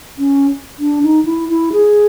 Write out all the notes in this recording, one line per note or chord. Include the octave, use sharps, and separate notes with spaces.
C#4
D4
D#4
E4
E4
G#4